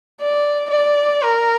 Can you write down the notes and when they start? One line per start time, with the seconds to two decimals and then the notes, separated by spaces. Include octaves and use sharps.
0.21 D5
0.71 D5
1.22 A#4